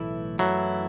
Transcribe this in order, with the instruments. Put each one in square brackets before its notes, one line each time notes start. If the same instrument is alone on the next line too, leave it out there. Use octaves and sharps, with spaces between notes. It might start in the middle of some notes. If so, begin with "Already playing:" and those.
Already playing: [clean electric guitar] B1 A2 E3 A3 E4
[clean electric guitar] F#2 E3 A3 E4 [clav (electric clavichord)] F#3